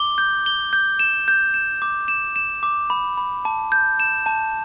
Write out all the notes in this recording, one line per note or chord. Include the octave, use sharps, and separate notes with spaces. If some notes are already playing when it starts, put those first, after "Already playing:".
Already playing: D6 G7
G6
G7
G6
E7
G6
E7
D6
E7
E7
D6
B5
B5
A5
G6
E7
A5